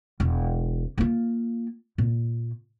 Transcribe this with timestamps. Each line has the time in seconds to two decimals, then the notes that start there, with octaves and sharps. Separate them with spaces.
0.20 E1
0.98 A#3 F4
1.98 A#2